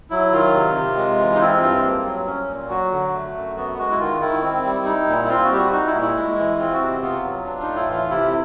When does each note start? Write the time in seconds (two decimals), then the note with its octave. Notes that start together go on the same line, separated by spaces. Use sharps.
0.11 F#3 E4
0.32 D#3 F4
0.54 C3
0.76 C3
0.97 G#3
1.19 E3
1.35 D#4
1.40 C4 E4
1.61 G2 F4
1.83 A#3
2.05 F#3
2.27 C#4
2.48 A#2
2.69 F#3 F#4
2.92 D3
3.13 A3
3.35 F#2
3.57 B3 F#4
3.78 G#3 F#4
3.91 E4
3.99 D#3 F4
4.21 D#3 E4
4.42 C4
4.64 G3
4.85 D#4
5.07 A#2
5.25 E4
5.29 C4 F4
5.44 F#4
5.50 G3 G4
5.57 F#4
5.72 D#4 F#4
5.87 E4
5.94 A#2
6.02 E4
6.15 G#3
6.38 E3
6.58 C4 F4
6.74 F#4
6.80 C3
7.02 B3 F4
7.23 F#3
7.45 D4
7.62 A2 D#4
7.76 E4
7.89 E3 F4
8.10 C3 E4